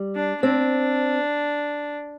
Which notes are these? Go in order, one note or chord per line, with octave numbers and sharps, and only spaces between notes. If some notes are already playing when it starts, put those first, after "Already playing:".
Already playing: G3
D4
C4 D4